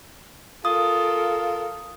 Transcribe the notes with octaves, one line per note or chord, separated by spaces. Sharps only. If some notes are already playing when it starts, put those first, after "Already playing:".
F4 A4 A#4 D#6